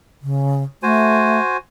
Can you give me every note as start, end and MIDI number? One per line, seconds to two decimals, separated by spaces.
0.22 0.63 49
0.83 1.40 57
0.83 1.57 66
0.83 1.57 72
0.83 1.57 80